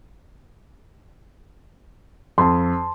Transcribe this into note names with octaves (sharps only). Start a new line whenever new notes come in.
F2 A5 C6